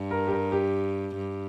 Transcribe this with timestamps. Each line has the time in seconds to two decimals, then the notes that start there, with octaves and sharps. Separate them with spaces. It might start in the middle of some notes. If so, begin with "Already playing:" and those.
Already playing: G2
0.11 A#4
0.27 G4
0.32 A#4
0.52 G4
1.15 G2